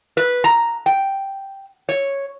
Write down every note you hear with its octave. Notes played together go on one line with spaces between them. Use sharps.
B4
A#5
G5
C#5